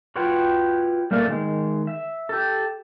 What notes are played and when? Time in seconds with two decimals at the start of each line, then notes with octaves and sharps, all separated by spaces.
0.16 F4 F#4 B4 C#5 F#5 G5
1.11 G3 A3 A#3 A#4 D5
1.28 D#3 G#3
1.87 E5
2.29 G4 A4